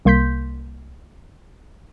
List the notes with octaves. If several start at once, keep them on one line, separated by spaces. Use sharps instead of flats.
C2 A#3 C6 G6 B6